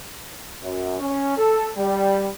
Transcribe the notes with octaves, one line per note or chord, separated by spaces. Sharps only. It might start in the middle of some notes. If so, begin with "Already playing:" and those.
F#2
C#4
A4
G3